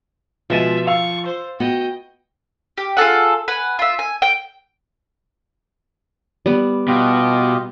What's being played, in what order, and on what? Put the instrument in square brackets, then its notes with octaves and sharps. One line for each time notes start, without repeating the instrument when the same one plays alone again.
[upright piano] B2 A6 D#7 [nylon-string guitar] F3 [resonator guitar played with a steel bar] G#3 F4 [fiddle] E5
[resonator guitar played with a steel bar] F5 [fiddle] C#6 [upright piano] E6 F7
[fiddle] C5
[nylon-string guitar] B3 F#4 [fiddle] D#5 G5
[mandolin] G4
F4 G#4 A4 F#5
B4 F#5 G#5
F4 E5
G#5
G5
[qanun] G3 B3
[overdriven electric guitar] B2 [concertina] F4 G4 D#5